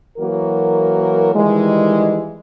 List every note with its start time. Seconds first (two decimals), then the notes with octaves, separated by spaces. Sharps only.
0.18 E3 F#3 A#3 F#4 A#4
1.34 D#3 E3 G3 G#3